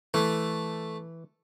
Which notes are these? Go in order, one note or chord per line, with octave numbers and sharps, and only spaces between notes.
E3 A3